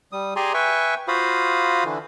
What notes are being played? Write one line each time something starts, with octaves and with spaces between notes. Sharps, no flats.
G3 D#6
G4 G#4 D5 G#5 A#5 C6
B4 E5 G5 G#5 C#6
F4 F#4 C5 F5 B5 D#6
D3 E3